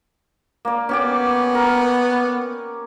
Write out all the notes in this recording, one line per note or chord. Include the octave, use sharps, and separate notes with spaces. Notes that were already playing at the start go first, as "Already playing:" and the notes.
A#3 D5
B3 C#4 G4 D5
A#4